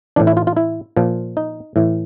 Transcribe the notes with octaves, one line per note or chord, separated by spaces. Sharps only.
A2 E3 D4
E4
F4
F4
E4
A#2 F3
D#4
A2 E3